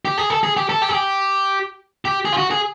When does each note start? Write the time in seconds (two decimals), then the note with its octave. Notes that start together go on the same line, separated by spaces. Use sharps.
0.05 G4
0.18 G#4
0.30 A4
0.43 G#4
0.57 G4
0.69 A4
0.82 G4
0.89 G#4
0.95 G4
2.05 G4
2.25 G#4
2.33 F4
2.37 F#4
2.51 G#4